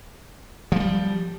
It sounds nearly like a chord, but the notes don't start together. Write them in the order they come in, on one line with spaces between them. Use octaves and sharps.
F3 A3 G3